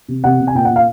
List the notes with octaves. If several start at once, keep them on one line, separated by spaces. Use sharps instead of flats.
C3
C3 F#5
C3
G#5
A#2 G5
F#5
A#2
F5